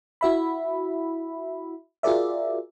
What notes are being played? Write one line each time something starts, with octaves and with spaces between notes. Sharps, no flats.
E4 F#4 E5 B5
F4 F#4 G#4 A#4 D5 E5